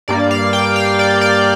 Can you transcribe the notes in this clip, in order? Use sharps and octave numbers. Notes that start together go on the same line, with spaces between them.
G2 G3 A#3 D5
F5
G5
F5
D5
D5